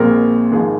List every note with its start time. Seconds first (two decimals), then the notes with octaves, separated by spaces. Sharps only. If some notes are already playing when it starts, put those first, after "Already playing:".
Already playing: A#1 A#2 G#3 C4 A#4
0.52 G#1 G#2 F3 G#3 G#4